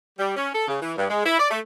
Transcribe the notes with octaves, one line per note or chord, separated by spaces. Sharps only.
G3
C#4
A4
C#3
E3
G2
G#3
E4
D5
A3